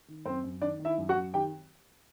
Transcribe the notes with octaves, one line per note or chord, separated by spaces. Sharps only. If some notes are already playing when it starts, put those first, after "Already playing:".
D#3
F#2 C4 C5
F#2
D#3 D4 D5
D#3
E4 E5
F#2
F#4 F#5
F#2
D#3 G4 G5